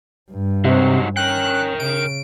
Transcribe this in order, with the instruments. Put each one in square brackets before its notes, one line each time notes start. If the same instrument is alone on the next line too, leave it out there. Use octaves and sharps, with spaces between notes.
[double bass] G2
[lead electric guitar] G#2 F#3 [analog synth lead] C3
[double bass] C#4 [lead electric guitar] A#4 G5 [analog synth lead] F#6
[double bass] C#3 [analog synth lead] D7